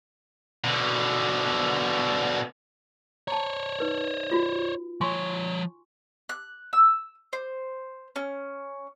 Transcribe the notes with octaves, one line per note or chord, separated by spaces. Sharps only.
B2 D3
C5 C#5 A5 A#5
D#4 B4
F4 F#4
F3 C#5 G#5 C6 C#6
F#6
E6
C5
C#4